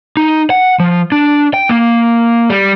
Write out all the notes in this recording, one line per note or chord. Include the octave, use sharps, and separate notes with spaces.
D#4
F#5
F3
D4
G5
A#3
G3